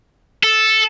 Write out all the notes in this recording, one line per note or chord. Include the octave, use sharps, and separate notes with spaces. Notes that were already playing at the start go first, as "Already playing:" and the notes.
A4